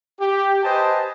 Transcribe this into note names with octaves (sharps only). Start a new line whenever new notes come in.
G4
B4 C5 D#5 G#5 A5